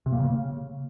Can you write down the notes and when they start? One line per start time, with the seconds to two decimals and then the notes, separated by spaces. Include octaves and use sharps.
0.06 C3
0.12 A#3
0.19 C#3